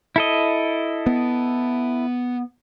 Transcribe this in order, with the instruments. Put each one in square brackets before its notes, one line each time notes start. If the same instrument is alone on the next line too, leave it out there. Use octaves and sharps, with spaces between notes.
[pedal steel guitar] E4 A4 D#5
[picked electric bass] B3